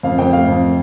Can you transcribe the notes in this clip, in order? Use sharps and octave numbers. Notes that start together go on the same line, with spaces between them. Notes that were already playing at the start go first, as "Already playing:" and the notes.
F2 F5
F2 G5
A3 F5
F2